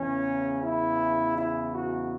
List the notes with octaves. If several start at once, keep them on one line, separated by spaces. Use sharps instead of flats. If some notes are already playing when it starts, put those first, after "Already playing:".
Already playing: E2 C#3 E3 C#4
E4
E4
F#4